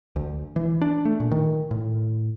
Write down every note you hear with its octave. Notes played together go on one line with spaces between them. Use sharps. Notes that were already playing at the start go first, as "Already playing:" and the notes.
D2
E3
D4
A3
A#2
D#3
A2